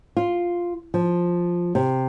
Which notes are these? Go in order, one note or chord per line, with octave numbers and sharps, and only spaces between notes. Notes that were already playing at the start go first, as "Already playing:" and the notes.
F4
F3
C3